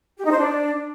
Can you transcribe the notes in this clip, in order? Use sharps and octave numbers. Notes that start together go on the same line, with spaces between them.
G4
D#4
C5
D4